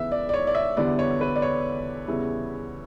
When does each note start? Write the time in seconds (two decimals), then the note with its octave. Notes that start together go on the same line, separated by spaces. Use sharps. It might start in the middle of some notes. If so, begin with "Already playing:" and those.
Already playing: C#3 E3 B3 E5
0.12 D5
0.29 D5
0.34 C#5
0.47 D5
0.55 E5
0.77 E2 D3 G3 B3 E4 D5
0.99 C#5
1.21 B4
1.36 D5
1.42 C#5
2.07 E2 C#3 G3 B3 E4